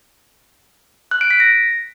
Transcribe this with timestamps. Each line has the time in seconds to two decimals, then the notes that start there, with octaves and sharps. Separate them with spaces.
1.11 F#6
1.21 D7
1.31 B6
1.40 A#6